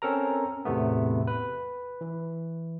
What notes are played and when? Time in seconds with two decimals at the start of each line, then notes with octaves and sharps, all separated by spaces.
0.02 C4 C#4 A4 A#4 A#5
0.65 E2 A2 C3 E3 A3 B3
1.27 B4
2.01 E3